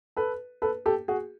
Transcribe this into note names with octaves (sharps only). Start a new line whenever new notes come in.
A4 B4
A4 B4
G4 A4
F#4 G#4